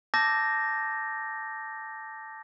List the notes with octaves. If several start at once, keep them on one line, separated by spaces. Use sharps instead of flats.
A5 D6 E6 G6 A6 A#6